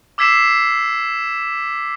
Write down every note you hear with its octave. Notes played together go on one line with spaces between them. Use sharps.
D6 E6 G#6 B6 C7 E7